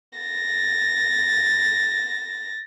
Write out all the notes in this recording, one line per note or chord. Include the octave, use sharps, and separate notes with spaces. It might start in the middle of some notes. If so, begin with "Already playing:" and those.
A6 A#6